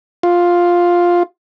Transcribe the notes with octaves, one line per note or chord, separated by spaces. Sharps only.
F4